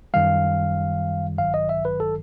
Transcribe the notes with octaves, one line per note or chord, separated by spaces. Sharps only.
F#2 D#3 G3 F5
A1 G2 D#3 F#3 F5
D#5
E5
B4
A4